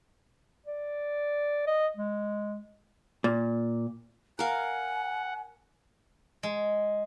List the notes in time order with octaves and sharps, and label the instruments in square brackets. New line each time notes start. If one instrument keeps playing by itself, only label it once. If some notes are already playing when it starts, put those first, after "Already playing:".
[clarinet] D5
D#5
G#3
[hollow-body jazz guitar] A#2
[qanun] A#4 F5 [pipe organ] F#5 [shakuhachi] G#5
[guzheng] G#3